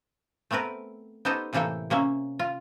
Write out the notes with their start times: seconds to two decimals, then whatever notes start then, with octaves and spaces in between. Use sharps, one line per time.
0.51 A3 B3 C4 A#4 B4
1.25 B3 D#4 G4 A4 C5 D#5
1.53 A2 C3 E3 A#3 A4 G5
1.90 C3 A#3 C#4 E5
2.39 F4